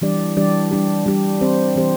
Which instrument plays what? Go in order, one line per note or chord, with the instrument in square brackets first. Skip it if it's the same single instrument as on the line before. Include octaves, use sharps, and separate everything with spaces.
[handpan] E3 G3 D4 G4 D5
E3 G3 D4 G4 D5
G3 D4 G4
G3 D4 G4
E3 C4 G4 C5
E3 C4 G4 C5